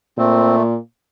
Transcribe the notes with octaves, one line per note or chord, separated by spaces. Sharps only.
A#2 A3 C4